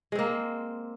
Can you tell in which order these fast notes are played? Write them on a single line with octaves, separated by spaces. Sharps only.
G#3 C4 A#3